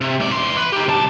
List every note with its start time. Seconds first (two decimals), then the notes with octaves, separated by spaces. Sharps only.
0.01 C3
0.20 G#2 D5
0.32 E2 C6
0.57 B4
0.72 D#4 G4
0.88 C2 A5